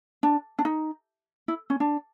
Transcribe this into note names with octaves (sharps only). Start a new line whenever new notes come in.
D4
D4
D#4
E4
C#4
D4